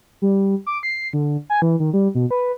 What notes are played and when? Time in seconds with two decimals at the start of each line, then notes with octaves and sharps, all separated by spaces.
0.22 G3
0.66 D6
0.83 C7
1.13 D3
1.50 G#5
1.62 E3
1.80 D#3
1.93 G3
2.15 B2
2.31 B4